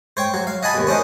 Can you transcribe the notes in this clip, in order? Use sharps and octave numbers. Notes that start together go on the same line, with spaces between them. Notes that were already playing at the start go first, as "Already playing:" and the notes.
C5 C#5 G5
F#3
F5
D#5 F#5 G#5 A5 B5
D#2 B2
C#4 D4 C5 D#5